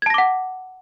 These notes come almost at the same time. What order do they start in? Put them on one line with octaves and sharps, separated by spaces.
G#6 A5 A#6 D6 F#5